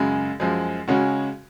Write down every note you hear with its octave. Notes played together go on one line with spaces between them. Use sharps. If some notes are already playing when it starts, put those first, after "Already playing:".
Already playing: F#2 C#3 G#3
F#2 F3 G#3
C#3 G#3 C#4 F#4